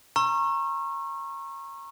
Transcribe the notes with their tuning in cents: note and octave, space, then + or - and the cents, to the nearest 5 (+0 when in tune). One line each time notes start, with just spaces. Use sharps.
A#5 +0 C#6 -25 E6 +40